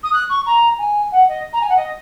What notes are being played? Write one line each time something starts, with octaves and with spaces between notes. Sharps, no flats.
D#6
F#6
C#6
A#5
G#5
F#5
D#5
A#5
G#5
F#5
D#5